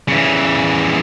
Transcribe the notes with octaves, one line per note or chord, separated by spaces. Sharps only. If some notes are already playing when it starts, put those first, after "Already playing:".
C#3 E3